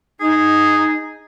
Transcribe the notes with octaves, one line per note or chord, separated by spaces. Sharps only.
D#4 G#4